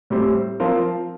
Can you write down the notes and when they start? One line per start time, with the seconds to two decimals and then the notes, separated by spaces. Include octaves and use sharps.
0.10 A2 G3 C4
0.60 F3 C4 F4 A#4